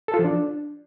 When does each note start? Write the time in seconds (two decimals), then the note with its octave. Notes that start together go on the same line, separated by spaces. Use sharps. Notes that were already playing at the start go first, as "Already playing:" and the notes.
0.08 A4
0.14 F4
0.19 F3
0.24 D4